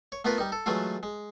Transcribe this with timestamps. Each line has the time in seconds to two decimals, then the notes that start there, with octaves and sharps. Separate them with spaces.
0.12 C#5
0.25 A3 B3 E4 F4 A#4 B4
0.38 G3 D#4
0.52 A4
0.66 E3 F#3 G#3 A3 F4
1.03 G#3